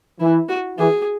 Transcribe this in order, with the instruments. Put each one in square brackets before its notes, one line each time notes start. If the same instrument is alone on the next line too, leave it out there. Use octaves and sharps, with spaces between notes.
[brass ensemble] E3 [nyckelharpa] E4
[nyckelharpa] F#4
[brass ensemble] E3 [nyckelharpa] G#4